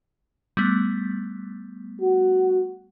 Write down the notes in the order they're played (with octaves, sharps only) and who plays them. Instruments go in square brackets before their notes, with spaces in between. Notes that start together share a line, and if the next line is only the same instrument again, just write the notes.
[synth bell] G3 A3 B3
[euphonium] F#4